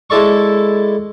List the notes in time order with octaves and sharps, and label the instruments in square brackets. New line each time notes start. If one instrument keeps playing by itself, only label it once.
[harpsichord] G#3 E4 A4 D5 C#6